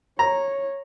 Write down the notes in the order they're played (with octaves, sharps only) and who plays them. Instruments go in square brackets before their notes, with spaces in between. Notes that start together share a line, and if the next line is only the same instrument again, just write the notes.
[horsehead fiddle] C#5 [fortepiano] A#5